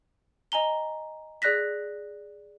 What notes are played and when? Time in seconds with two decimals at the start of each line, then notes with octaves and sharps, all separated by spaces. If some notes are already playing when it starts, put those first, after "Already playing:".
0.52 D#5 G#5 A#5 G7
1.42 G#4 D5 F#6 A#6 B6